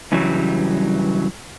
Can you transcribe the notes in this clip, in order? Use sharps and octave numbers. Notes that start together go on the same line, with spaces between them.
G2 C#3 E3 F#3 G3